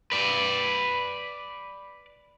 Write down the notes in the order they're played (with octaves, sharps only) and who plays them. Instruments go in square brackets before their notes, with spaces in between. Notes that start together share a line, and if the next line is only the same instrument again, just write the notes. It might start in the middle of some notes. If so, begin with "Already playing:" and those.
[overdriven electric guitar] B4 D5